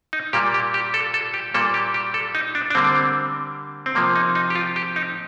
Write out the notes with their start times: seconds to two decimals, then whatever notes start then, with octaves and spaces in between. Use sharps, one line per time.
0.13 D#4
0.33 A#2 G3 A#3 G4
0.54 G4
0.74 G4
0.94 A4
1.14 A4
1.34 G4
1.54 A#2 G3 A#3 A4
1.74 G4
1.94 G4
2.14 A4
2.35 D#4
2.55 D4
2.70 D4
2.75 D3 G3 A#3 C4
3.86 C4
3.95 C3 F3 A#3
4.16 D#4
4.35 D#4
4.50 G4
4.55 F4
4.76 G4
4.96 D#4